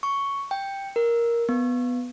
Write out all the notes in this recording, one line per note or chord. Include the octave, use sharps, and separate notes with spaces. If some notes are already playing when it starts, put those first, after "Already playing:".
C#6
G5
A#4
B3